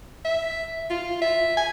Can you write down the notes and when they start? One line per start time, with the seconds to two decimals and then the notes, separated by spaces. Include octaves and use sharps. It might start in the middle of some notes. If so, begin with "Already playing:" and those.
0.25 E5
0.90 F4
1.22 E5
1.57 G#5